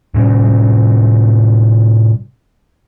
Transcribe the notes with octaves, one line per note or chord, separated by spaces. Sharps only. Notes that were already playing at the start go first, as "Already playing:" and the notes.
A2 C3 G3 C#4